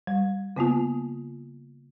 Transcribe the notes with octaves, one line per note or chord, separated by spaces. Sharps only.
G3
C#3 A#3 B3 F4